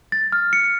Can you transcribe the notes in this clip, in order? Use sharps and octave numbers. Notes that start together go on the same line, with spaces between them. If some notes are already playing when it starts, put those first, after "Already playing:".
A6
F6
C#7